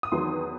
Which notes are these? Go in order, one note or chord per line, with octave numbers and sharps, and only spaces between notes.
D#6
E2 D#3 F#3 B3 C6